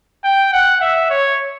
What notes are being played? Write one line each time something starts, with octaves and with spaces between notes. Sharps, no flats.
G5
F#5
E5
C#5